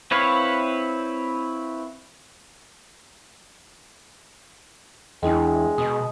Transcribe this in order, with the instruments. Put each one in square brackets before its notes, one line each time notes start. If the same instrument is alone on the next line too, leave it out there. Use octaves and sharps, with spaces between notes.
[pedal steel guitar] C4 E4 B4 C#5 F5
[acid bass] E2 [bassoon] G#3 [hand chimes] D4 E4 G5
[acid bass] B2 [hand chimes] D#6